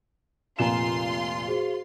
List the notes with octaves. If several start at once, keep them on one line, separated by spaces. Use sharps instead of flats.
F1 A#2 F4 G#5 A#5 C6 E7
F#4 G#4 C5